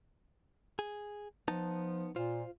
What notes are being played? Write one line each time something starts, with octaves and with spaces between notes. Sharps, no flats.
G#4
F3 B3 D#4 A5
A#2 F4 C5